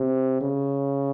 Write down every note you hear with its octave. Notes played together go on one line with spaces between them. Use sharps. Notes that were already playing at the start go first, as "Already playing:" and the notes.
Already playing: C3
C#3